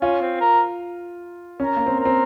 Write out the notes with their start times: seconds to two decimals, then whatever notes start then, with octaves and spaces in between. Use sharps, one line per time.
0.02 C#4 F4
0.22 C4
0.41 A#4
1.60 C#4 A#4
1.77 A#3
1.86 C4
1.99 A#4
2.05 C4